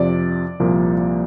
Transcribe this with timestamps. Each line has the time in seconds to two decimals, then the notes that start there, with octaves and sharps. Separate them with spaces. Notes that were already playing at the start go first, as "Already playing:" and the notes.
Already playing: F2 C3 F3 D5
0.60 C2 A#2 F3 A#3